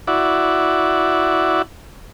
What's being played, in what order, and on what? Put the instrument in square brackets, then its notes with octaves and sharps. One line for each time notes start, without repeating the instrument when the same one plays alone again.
[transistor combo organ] E4 F#4 D5